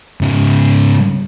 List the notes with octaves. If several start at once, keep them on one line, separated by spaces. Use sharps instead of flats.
G#2 C#3